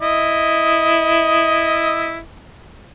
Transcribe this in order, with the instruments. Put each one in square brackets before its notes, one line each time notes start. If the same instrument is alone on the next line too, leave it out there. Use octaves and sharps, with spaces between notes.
[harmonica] E4 D#5